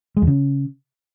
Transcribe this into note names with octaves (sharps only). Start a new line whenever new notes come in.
G#3
E2
C#3